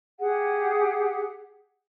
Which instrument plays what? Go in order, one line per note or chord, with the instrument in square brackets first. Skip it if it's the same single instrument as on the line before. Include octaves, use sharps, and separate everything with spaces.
[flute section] G4 G#4 F#5